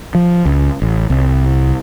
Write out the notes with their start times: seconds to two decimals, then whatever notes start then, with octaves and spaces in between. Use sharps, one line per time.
0.15 F3
0.45 C#2
0.82 A1
1.10 C2